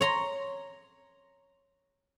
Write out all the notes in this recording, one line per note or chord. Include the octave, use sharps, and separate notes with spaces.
C#5 A#5 C6